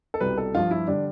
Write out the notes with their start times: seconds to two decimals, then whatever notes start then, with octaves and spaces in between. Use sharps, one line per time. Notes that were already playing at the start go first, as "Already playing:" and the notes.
0.14 A4
0.20 C2 B2 G3 B4
0.38 A4
0.55 G2 F3 F4
0.71 E4
0.87 D3 G3 D4